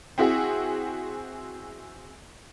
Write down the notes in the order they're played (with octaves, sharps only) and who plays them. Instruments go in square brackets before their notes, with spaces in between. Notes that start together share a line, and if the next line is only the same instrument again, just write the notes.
[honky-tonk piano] C4 E4 F#4 G#4